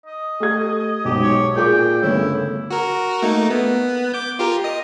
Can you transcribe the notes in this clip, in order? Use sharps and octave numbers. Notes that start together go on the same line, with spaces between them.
D#5
A3 G4 G#6
B1 G#2 G4
C#5
A#2 G#4 G5 D6
G1 C#3 A3 E4
F#4 A#4
A3 A#3 D#4
B3
D6 G6
F4 G4 A#4
D#5 D#6